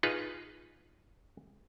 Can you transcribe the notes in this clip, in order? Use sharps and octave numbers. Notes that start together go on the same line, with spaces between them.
D#4 F4 G#4 B4